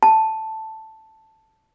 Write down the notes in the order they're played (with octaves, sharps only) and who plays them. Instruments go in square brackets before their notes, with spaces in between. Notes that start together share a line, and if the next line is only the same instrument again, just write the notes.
[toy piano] A5